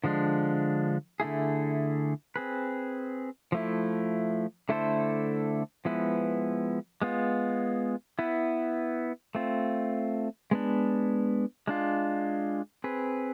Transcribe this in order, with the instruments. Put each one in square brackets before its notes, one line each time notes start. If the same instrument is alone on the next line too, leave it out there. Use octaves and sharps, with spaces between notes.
[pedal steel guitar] D3 F3 G#3 D4
D3 A3 E4 G#4
C4 G#4 B4
F3 A3 E4
D3 A3 E4 A4 C5
F3 G#3 B3 E4 B4
G#3 B3 F4
B3 E4 B4
A3 C4 F4
G#3 B3 D4
G#3 D4 F4
C4 G#4 B4